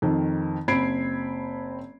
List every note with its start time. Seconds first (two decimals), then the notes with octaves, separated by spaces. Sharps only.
0.02 F2 D#3 C4
0.68 F#1 C4 B5 G#6 C7 D7